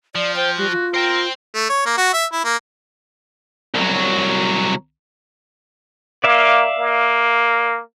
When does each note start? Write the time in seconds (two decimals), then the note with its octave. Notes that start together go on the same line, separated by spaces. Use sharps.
0.15 F3 D5
0.36 C5 G5
0.58 G3 F#4
0.72 F4
0.94 A#4 C5 G5
1.55 A3
1.70 C#5
1.86 A#3
1.97 F#4
2.13 E5
2.33 E4
2.45 A#3
3.74 C2 F#3
6.24 A#3 D5 E5 F5
6.78 A#3